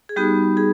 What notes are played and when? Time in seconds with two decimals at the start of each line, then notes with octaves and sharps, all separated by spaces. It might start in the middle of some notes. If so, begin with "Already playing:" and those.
0.09 G#4
0.16 G3 B3 D#4 F#4 G4
0.57 G#4